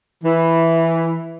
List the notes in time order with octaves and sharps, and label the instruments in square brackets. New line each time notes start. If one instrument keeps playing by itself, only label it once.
[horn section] E3